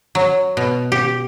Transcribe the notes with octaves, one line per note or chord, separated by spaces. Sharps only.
F#3
B2
G4